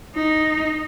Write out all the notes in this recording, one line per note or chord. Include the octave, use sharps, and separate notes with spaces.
D#4